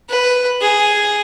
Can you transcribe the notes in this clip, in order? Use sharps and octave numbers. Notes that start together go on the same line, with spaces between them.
B4
G#4